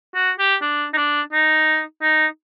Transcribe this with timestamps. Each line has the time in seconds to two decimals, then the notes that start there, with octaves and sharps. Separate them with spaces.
0.15 F#4
0.39 G4
0.62 D4
0.93 D#4
0.97 D4
1.33 D#4
2.02 D#4